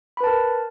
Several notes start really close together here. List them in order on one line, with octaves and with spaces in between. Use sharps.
B5 B4 A5 A#4